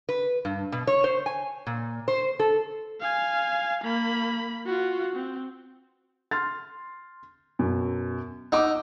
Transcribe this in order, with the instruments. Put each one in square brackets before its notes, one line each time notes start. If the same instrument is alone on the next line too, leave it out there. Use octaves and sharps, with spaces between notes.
[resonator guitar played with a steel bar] B4
G2
B2
C#5
C5
G#5
A#2
C5
A4
[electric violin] F5 G#5
A#3 B5
F4 F#4
C4
[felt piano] C6 F6 A6
F#2 B2
[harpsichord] D#4 [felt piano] F#5 D6 E6